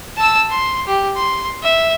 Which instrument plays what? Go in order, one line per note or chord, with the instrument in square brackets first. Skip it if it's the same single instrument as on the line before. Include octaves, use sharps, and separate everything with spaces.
[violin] A5 E6
C6
G4
C6
E5